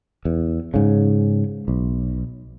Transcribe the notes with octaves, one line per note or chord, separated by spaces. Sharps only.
E2
G#2 C#3
B1